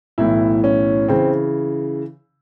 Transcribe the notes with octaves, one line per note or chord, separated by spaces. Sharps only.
B1 A2 E3 E4
C#4
C#3 E3 C4